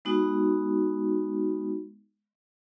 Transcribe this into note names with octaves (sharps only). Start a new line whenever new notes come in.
G#3 B3 D#4 F#4